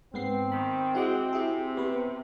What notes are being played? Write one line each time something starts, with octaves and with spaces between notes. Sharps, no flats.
G#2 B3 C4 C7
D#3 B5
G#3 E4 F#4 F#5 D6
C3 E4 G#4
B3 G4 B4